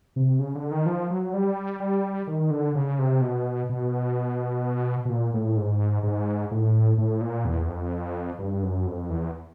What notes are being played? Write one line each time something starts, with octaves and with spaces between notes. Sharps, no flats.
C3
C#3
D3
D#3
F3
F#3
G3
G3
D#3
D3
C#3
C3
B2
B2
B2
A#2
A2
G#2
G#2
A2
A2
A#2
E2
F2
G2
F#2
F2
E2